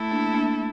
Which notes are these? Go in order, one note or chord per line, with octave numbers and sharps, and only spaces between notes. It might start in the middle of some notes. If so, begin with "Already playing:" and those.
Already playing: A3 E4 A4
A#3 D4
A#3 D4